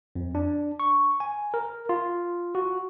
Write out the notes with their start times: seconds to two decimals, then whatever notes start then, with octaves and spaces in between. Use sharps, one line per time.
0.15 F2
0.35 D4
0.80 C#6
1.20 G#5
1.54 A#4
1.89 F4
2.55 F#4